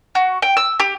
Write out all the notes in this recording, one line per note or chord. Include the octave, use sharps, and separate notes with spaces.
F#4
G5
E6
G4